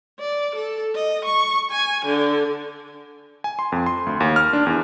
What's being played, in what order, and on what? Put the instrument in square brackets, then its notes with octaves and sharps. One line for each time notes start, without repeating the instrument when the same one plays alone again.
[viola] D5
A4
D#5
C#6
G#5
D3
[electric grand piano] G#5
C6
F2
C6
D2
D#2
F6
D4
E2